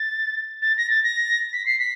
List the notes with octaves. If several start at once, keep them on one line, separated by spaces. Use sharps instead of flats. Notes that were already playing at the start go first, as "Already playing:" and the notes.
Already playing: A6
A6
A#6
A6
A#6
B6
C7
B6